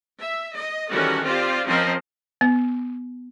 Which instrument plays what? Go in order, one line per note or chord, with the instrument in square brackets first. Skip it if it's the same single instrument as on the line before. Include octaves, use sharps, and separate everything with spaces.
[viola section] E5
D#5
D#3 E3 G3 C#4 F#4 A4
C4 F4 G4 C5 D5
F3 C4 C#4 A#4 C5 D#5
[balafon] B3